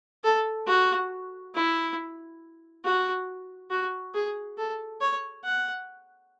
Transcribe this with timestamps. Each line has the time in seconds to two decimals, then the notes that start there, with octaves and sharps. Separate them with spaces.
0.24 A4
0.67 F#4
1.55 E4
2.84 F#4
3.70 F#4
4.14 G#4
4.58 A4
5.01 C#5
5.44 F#5